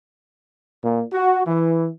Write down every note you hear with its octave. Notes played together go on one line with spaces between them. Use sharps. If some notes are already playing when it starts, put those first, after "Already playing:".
A#2
F#4
E3